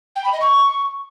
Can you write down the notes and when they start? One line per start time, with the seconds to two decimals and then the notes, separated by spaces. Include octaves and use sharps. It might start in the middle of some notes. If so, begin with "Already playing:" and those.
0.16 G5
0.24 B5
0.32 D#5
0.41 C#6